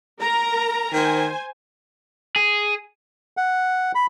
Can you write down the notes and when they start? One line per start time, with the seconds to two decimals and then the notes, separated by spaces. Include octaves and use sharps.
0.20 A#4 A#5
0.93 D#3 C5 G#5
2.36 G#4
3.37 F#5
3.95 B5